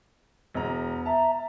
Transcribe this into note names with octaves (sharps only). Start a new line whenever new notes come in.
E1 A#5
E5 A5 A#5